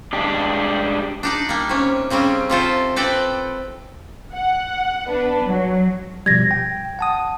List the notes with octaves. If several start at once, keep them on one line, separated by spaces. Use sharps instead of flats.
G#3 D4 G4
D4 D#4 D5
G3 A#3
C3 C#4
C#3 G3 C4 C#4
C3 F4 A4 C5
C4 A4 B4 D5 G5
F#5
B3 D4 B4
F#3
B2 F3 G3 G#6 A#6
G5
F#5 A5 D#6